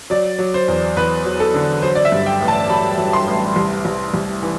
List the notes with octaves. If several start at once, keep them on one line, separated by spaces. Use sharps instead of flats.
F#3 D5
F#3
C5
E2
E2 B4
F#3
A4
D3
F#3 C5
D5
E5
G2
G5
A1
A5
F#3 B5
F#3
C6
A1
C2
C2
C2
E3